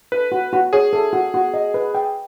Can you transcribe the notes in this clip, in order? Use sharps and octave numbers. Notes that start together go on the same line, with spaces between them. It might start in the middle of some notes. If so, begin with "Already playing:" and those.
A4 B4
F#4
F#4
G#4 C#5
A4
F#4
F#4
D#5
B4
G5